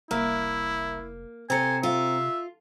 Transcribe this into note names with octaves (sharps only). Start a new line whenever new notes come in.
F1 C2 A#3 E4 A#4 E5
C3 C4 A4 C5 G#5 A#5 C#7
F4 E5